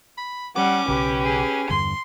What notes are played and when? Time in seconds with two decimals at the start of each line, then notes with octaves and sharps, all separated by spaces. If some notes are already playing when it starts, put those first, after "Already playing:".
0.18 B5
0.56 G3 C#4 F#5 D6
0.88 B1 C#3 G4 B4
1.25 G#4
1.70 E2 G2 D3 C6